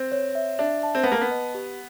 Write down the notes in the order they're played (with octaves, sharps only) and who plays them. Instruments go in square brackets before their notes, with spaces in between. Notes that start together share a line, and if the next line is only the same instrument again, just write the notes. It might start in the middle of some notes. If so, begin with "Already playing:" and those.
Already playing: [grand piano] C4
[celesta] C#5
E5
[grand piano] D4 [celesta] E5
[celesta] A5
[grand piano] C4
B3
[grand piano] A#3 [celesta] A5
[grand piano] B3
[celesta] D#5
G4